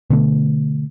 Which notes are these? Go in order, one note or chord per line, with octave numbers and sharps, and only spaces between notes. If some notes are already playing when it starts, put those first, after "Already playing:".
B2 D3 A3